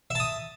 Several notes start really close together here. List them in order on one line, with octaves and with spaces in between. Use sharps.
E5 A5 D#6